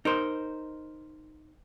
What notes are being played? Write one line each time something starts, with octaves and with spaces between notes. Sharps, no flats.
D#4 A#4 C5